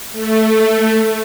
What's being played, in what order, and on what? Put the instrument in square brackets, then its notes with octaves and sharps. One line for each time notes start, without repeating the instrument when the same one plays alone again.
[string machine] A3